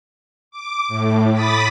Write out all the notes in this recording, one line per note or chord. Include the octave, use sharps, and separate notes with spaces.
D6
A2
B5 D6 D#6 A6 B6